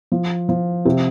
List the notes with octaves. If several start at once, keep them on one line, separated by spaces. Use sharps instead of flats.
F3
F3
C3